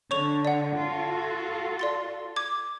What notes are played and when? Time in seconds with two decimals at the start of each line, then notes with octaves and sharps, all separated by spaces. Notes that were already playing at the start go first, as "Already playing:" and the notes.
0.11 D3 C#5 C#6 F7
0.45 D5 F#5
0.77 F4 F#4 A4
1.79 D5 C6 A6
2.36 D6 G#6